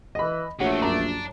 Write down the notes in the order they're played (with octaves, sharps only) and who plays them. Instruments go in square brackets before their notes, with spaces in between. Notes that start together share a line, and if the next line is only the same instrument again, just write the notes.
[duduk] E3 [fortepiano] D#5 B5
[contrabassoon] A#1 [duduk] A3 [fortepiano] F#4 [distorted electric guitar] G4 C#5
[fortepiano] F#2 A#5 [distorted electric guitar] D5 A5